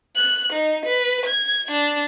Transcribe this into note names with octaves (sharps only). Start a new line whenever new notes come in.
F#6
D#4
B4
G#6
D4